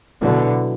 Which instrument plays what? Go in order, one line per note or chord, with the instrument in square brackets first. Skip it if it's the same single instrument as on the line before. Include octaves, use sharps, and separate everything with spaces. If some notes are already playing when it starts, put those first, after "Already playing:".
[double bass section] B2 D3 [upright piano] F#3 B3 E4 A4